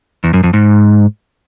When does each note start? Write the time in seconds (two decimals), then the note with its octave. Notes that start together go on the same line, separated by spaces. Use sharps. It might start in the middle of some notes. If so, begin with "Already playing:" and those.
0.24 E2
0.34 F#2
0.43 F2
0.53 G#2